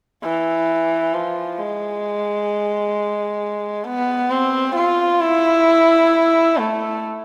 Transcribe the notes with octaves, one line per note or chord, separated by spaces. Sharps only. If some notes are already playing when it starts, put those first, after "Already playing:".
E3
F3
G#3
B3
C4
F4
E4
A3